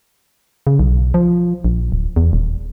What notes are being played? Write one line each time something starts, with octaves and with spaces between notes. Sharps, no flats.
C#3
B1
F3
A#1
D1
E2
D#1